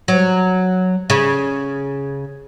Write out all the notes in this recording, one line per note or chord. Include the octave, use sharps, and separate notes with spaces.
F#3
C#3